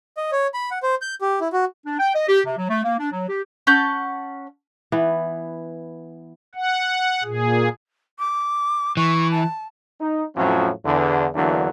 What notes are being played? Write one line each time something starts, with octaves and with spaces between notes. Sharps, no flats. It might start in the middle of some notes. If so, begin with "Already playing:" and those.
D#5
C#5
B5
F#5
C5
G6
G4
E4
F#4
D4
G5
D#5
G4
C3
F#3
A3
A#3
D4
F#3
G4
C#4 F#5 A5 G6
E3 B3
F#5
A#2 G#4
D6
E3 C#6
A5
D#4
F2 A2 F3 F#3 C#4
E2 D3
E2 D3 E3 F#3 A#3 D4